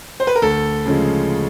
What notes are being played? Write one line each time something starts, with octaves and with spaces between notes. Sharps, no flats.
C5
B4
A#4
D2 A4
C#3 F3 G#3